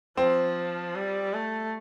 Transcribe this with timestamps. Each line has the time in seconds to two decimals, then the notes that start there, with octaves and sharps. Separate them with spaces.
0.17 F3 C4
0.95 G3
1.33 A3